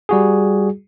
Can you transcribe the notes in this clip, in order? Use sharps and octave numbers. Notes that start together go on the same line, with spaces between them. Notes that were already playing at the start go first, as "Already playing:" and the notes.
G3 F#4 G#4